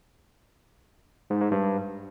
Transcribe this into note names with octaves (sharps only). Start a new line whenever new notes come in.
G#2
G#2
G2